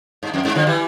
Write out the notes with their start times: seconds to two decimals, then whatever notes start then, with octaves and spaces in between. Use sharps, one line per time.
0.23 G2
0.34 F2
0.45 G2
0.55 D3 F3
0.67 E3 G3